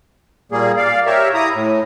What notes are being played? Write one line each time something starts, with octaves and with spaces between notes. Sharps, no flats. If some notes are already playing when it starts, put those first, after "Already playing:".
A#2 G3 A#3 G#4
D5 F5
G4 A#4 C#5 E5
E4 A#5 D#6
A2